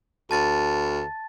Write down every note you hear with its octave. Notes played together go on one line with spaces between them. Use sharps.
D2 A5 A6